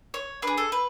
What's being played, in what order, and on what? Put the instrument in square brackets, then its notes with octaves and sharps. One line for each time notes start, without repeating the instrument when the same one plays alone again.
[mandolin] C#5
D4 G#4 B4
A4
B4